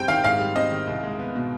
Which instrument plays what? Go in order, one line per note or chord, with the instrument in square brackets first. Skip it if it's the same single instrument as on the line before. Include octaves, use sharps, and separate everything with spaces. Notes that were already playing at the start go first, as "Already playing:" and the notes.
Already playing: [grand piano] G#2 G3 C4 [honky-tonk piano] G5
[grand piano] D#3 [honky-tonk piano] F5
[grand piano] G#2 [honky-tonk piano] F5
[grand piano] G3
[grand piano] C4 [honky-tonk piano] D#5
[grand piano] D#3
C2
G#3
B3
B2